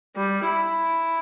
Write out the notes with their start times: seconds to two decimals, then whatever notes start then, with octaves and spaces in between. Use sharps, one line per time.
0.17 G3
0.48 E4